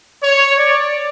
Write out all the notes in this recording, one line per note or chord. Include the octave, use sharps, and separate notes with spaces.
C#5
D5